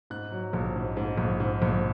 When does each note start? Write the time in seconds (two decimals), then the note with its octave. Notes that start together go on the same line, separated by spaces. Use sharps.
0.10 G#2 F#6
0.31 F#3
0.53 A#1
0.76 G#2
0.97 G#2
1.17 A#1
1.40 G#2
1.62 A#1